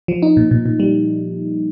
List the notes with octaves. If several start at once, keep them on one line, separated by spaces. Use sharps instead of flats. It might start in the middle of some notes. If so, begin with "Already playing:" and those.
F3
D#4
A#2
A#2
A#2
G3